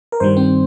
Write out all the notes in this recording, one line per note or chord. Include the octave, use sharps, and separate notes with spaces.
A#4
G2 D#3 G3 C5
C4